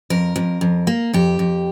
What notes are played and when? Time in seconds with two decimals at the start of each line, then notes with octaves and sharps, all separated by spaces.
0.10 F2 A#4
0.36 F2
0.61 F2
0.87 A#3
1.14 F2 G4
1.39 F2